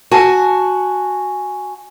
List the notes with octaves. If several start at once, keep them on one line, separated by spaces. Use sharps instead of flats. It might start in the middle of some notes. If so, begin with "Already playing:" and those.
F#4 G#5 A5